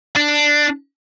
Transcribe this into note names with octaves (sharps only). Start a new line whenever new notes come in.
D4